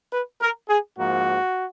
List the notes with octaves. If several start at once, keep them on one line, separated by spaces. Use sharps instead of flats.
B4
A#4
G#4
G#2 F3 A#3 F#4